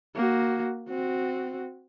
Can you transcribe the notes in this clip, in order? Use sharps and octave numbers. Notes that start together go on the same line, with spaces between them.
A#3 F#4
C4 F#4